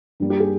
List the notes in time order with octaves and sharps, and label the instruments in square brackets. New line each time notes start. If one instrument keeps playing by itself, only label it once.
[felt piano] G2 G3 A#3
G4
G#4